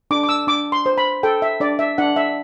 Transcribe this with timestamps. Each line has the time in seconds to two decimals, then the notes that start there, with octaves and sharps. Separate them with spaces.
0.11 D4 D6
0.23 D6
0.29 E6
0.47 D4 D6
0.72 C6
0.86 C5
0.98 B5
1.23 A4 G5
1.42 E5
1.60 D4 D5
1.79 E5
1.98 D4 F#5
2.16 E5